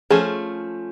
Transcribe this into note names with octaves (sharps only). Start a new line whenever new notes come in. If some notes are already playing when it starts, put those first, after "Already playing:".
F3 A3 C#4 G#4